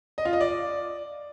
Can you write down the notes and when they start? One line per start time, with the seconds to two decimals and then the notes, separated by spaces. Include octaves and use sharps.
0.18 D#5
0.25 F4
0.33 D#5
0.41 D5